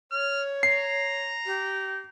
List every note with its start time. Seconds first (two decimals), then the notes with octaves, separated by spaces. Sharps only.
0.12 C#5 F6
0.63 A#5 C7
1.46 G4